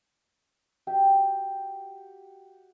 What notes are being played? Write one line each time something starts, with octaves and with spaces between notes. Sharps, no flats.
F#4 G4 E5 G5